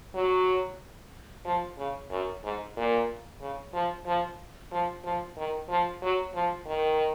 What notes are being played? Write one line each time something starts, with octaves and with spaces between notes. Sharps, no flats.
F#3
F3
C#3
F#2
G#2
A#2
C#3
F3
F3
F3
F3
D#3
F3
F#3
F3
D#3